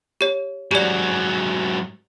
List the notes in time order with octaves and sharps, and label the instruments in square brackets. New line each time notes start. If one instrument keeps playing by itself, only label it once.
[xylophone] G4 C#5
[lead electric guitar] G#2 F#3 [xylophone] G4 D5